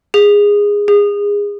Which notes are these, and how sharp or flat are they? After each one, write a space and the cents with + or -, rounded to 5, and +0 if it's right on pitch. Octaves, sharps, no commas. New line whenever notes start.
G#4 -15
G#4 -25